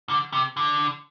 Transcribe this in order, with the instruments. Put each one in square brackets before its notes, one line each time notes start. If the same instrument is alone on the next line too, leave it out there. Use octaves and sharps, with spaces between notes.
[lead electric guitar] D3
C3
D3